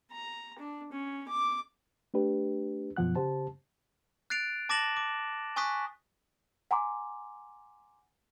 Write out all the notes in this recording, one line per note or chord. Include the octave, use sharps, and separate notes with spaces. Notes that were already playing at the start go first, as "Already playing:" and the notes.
A#5
D4
C#4
D6
A3 D4 G4 B4
F#2 B2 F3 F#5 F#6
C#3 G4 C5 A5
F#6 A6 C7 D7 F7
A5 D6 A6 A#6 E7 F#7
D6
G#5 C#6 D#6 F#6 B6
F#5 G#5 A#5 C6 D6